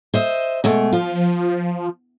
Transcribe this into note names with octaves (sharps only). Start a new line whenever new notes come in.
C5 D#5 E5
B2 G#3 A3
F3 F4